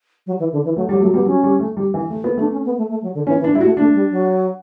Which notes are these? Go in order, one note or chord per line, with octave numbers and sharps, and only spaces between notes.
F#3
E3
D3
E3
F#3 A3
F#3 G3
F#3 A3
G3 B3
F#3 C#4
G3
A3
G3
E3
A3
B3
A3 D4
C#4
B3
A3
A3
F#3
D3
E3 C#4
E3
D4
G3
E4
F#4
A3
A3 D4
G3
F#3